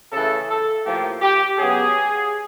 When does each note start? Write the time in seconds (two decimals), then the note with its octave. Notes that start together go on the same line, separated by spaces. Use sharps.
0.12 C#3 E3 A3 A4
0.49 A4
0.85 A2 F3 A#3 G4
1.21 G4
1.58 C#3 F#3 B3 G#4